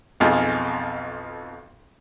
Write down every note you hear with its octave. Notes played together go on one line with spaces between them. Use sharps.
B1 F2 D#4 F4 G#4